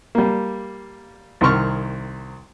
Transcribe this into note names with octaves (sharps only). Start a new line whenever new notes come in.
G3 A#3
C2 D#3 C4 C#6 F6